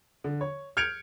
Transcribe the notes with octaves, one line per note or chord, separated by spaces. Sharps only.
D3
C#5
F6 G6 G#6 C#7 D7 F7